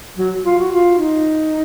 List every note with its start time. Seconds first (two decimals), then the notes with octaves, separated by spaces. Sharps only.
0.17 F#3
0.45 F4
0.58 F#4
0.72 F4
0.99 D#4